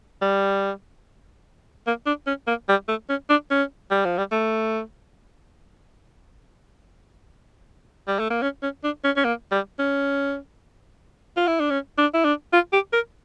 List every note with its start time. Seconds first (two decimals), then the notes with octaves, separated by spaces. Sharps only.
0.22 G3
1.87 A#3
2.06 D4
2.27 C#4
2.47 A#3
2.69 G3
2.88 A3
3.09 C#4
3.29 D4
3.50 C#4
3.91 G3
4.05 F3
4.18 G3
4.32 A3
8.08 G3
8.19 A3
8.30 A#3
8.42 C#4
8.63 C#4
8.84 D4
9.04 C#4
9.17 C#4
9.24 A#3
9.51 G3
9.79 C#4
11.37 F4
11.47 E4
11.60 D4
11.70 C#4
11.98 D4
12.14 E4
12.24 D4
12.53 F4
12.73 G4
12.93 A#4